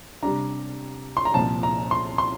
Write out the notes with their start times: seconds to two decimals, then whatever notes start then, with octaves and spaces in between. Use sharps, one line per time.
0.23 C3 G3 D4 A#5
1.17 C6
1.25 A#5
1.34 C2 A#2 F3 A5
1.63 A#5
1.91 C6
2.18 C6